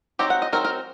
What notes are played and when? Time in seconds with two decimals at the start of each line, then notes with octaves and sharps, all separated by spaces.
0.19 F#3 C4 D#4 G4
0.30 F#5
0.42 D#5
0.53 F#3 C4 D#4 A#4
0.65 A#4